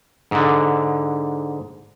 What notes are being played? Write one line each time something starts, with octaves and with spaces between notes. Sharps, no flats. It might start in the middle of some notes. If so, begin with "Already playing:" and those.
G#2 D3